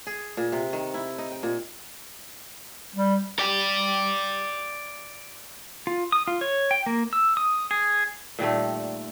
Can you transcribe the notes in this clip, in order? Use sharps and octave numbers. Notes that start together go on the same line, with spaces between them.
G#4
A#2
C3
D#3
E4
D#4
G5
A#2
G3
D5 G5
F4
D#6
F4
C#5
G5
A#3
E6
D#6
G#4
A#2 D#3 G3 A3